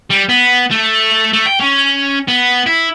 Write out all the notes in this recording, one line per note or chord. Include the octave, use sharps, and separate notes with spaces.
G3
B3
A3
A3
G5
C#4
B3
E4